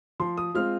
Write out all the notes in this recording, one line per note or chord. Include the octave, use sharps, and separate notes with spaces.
F3 C6
D#6
G#3 C4 F4 F6